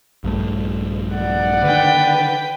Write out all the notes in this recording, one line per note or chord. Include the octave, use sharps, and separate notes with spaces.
A#1 G2 A3
D5 F#5
D3 D#3 B4 G5